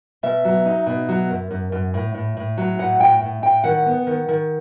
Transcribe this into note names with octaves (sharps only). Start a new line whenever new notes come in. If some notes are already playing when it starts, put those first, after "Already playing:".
B2 E5
F#3
D#4
B2
F#3
F#2
F#2
F#2
A2
A2
A2
F#3
A2 F#5
A2 G5
A2
A2 G5
D#3 F#5
B3
D#3
D#3